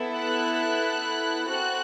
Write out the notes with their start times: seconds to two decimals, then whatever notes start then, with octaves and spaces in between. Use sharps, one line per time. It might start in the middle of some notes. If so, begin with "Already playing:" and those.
Already playing: B3 E4 A4
0.17 F#6
1.48 C4 F#4 A4 F#6